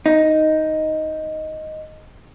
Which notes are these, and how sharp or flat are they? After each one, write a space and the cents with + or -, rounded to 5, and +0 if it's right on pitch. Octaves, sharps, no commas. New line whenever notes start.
D#4 +5